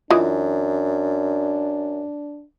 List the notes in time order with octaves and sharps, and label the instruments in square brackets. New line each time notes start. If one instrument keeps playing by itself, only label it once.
[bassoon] F#2 [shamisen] E3 [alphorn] D4 [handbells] F4 D#5 D#6